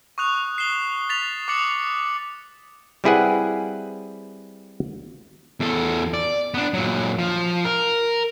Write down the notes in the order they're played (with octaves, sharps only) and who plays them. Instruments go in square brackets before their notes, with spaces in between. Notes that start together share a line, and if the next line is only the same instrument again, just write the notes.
[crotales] C#6 D#6 F#6 F7
C7 E7 G7
A6 B6 F7
D6 D#6 F#6 C#7 F#7
[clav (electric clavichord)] G3 C4 E4 G#4 B4 F#5
[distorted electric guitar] E2 A4
D5
B3 D4
A#2 F#3
F3
A#4